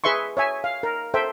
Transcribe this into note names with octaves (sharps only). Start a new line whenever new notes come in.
G#4 B4 E5 C6 C#6
C#5 E5 G#5
F5
A#4
A4 C5 E5 G5